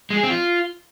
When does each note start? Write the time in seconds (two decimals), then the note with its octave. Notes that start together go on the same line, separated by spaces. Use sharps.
0.10 G#3
0.17 G#4
0.23 C4
0.30 F4